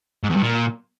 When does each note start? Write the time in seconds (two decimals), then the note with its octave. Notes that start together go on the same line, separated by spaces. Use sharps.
0.24 G#2
0.30 E2
0.37 G2
0.43 A#2